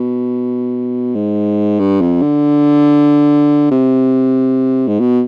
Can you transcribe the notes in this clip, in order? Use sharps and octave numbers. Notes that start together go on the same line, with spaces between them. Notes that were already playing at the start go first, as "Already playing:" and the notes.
Already playing: B2
G#2
G2
F2
D3
C3
G#2
B2